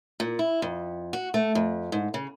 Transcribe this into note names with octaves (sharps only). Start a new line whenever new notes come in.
A#2
E4
F2
F#4
A3
F2
G#2
C#3